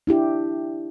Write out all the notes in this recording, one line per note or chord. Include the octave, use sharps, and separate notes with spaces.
D4 E4 G4